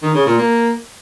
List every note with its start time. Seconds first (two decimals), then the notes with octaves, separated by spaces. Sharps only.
0.03 D#3
0.15 C#3
0.26 A#2
0.38 A#3